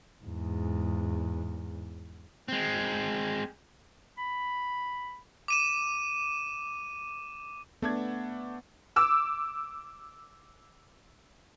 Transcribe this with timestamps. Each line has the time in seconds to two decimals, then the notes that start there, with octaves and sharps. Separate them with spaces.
0.24 E2 G#2
2.48 G#3 C4
4.18 B5
5.48 D6 D#7 E7
7.82 A3 B3 D4 G#6
8.96 D6 E6